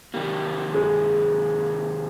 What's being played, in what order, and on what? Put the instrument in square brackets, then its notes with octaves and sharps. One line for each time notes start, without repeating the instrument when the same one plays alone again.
[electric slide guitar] C3 D#3 A#3 [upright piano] G3
[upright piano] G#3